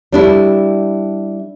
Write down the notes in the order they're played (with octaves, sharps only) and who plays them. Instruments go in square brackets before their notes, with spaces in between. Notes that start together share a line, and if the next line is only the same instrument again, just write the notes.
[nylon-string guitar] G3 D4 E4